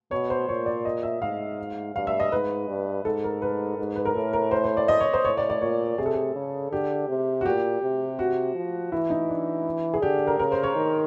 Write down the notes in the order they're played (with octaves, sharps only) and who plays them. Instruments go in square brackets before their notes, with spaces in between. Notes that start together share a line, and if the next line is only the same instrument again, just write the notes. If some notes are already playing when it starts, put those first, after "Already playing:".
[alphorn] B2 [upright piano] C#5
[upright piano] C5
[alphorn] A#2 [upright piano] C#5
[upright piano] D5
D#5
E5
[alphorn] G#2 [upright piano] F5
[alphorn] G2 [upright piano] F5
[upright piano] E5
D#5
[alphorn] G#2 [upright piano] B4
[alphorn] G2
[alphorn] G#2 [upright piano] A4
[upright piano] A#4
B4
[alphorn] G#2
[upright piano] B4
A#4
[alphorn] A2 [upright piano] A4
[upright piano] A#4
C5
C5
D5
D#5
C#5
C5
[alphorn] A2 [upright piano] C#5
[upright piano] D5
D5
[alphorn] A#2 [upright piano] C#5
[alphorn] C3 [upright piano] G#4
[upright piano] A4
G#4
[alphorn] C#3
[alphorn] D3 [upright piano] G4
[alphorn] C3
[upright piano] F#4
[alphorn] A#2 [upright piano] G4
[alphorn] C3
[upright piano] F#4
[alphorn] F3
[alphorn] E3 [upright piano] E4
[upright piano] D#4
D4
G#4
[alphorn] D3 [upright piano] G4
[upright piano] A#4
[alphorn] C#3 [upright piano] A#4
[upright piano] C5
C#5
[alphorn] D#3